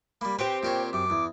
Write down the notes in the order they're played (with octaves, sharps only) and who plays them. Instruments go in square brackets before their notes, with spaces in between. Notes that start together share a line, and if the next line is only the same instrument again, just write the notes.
[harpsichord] G3 A#3 [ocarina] B5
[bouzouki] C4 G4 [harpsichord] B4 [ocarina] C5
[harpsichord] A#2 A#4 C#5
[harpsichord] F#2 [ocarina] D6
[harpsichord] E2